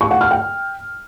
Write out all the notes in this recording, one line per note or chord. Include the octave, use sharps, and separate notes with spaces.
C#6
F#5
F6
G5